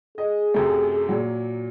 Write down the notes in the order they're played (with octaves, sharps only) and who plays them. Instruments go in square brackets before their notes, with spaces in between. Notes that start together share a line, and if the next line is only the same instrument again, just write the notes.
[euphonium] G#4 [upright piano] D#5
[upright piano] F#2 C3 A3
A#2 F#3